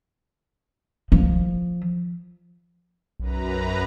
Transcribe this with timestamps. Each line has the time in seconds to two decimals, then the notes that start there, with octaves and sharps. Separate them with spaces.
1.12 F3
3.20 B1 F#2 B4 A#5